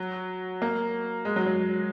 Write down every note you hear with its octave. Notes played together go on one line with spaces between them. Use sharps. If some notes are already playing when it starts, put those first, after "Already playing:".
Already playing: F#3
A#3
G#3
F#3
F#3